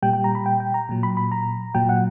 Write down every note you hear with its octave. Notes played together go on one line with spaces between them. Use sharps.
A#2 G3 G5
G5
A#5
B5
G5
G5
A#5
A#2 F#3
B5
B5
A#5
A#2 F#3 G5
F#5